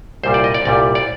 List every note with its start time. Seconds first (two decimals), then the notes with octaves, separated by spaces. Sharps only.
0.23 C2 A#2 G3 C5
0.34 D5
0.44 D#5
0.54 D5
0.65 C2 A#2 G3 D5
0.95 D5